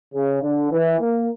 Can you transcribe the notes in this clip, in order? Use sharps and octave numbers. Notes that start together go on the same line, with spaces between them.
C#3
D3
E3
A#3